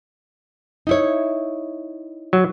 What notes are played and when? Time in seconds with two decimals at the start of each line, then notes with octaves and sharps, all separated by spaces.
0.87 D#4 E4 C#5
2.33 F#3